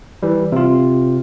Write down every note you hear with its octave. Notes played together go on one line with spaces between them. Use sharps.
E3 G3
C3 F4